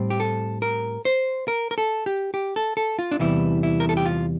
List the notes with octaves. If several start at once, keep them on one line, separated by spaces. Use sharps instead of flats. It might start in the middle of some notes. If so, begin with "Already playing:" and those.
Already playing: A2 G3 C4
G4
A4
A#4
C5
A#4
A#4
A4
G4
G4
A4
A4
F4
D4
E2 C3 E3 G3 E4
E4
A#4
A4
G4
F4